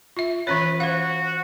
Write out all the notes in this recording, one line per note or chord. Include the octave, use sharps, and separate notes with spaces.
F4 E5
E3 C#4 B4 C#5
F#4 C5 F5